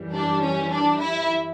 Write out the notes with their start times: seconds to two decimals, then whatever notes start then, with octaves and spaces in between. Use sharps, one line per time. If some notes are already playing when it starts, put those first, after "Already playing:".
Already playing: F#2 E3 G3
0.12 D4
0.42 C#4
0.71 D4
1.01 E4